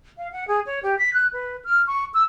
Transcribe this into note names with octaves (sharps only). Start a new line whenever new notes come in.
F5
F#5
G#4
C#5
G4
B6
F#6
B4
F6
C#6
E6